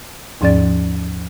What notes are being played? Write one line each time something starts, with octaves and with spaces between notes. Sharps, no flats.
D#2 G#2 F3 C#4 D5 A6